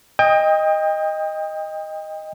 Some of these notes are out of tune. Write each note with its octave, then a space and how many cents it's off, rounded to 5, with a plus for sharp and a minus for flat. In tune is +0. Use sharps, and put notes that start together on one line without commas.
D#5 +0 G5 +30 D#6 +20